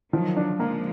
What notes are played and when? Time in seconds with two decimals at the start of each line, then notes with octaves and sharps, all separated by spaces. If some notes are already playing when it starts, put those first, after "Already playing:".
0.13 D#3 F3 F#3
0.37 D4
0.59 F3 G#3 A#3